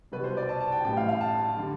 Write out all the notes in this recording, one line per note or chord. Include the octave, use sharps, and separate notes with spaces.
C2 B2 G3 B4
C5
D5
A5
A5
G5
A1 A2 G3 G5
F5
F5
A5
D3 G3